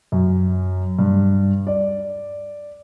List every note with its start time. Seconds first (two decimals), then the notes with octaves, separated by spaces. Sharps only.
0.12 F#2
0.99 G2
1.67 D5